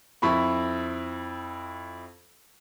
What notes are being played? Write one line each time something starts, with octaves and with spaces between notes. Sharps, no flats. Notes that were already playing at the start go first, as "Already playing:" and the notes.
F2 E4 B5 C#6